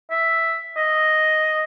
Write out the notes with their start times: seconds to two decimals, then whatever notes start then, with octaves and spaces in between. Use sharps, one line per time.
0.11 E5
0.77 D#5